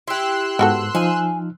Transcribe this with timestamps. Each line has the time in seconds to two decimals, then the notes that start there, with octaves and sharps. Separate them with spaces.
0.08 E4 G4 C6 E6 F#6
0.59 G#2 B3 F#4 A4
0.95 F3 D#4 G#5 F6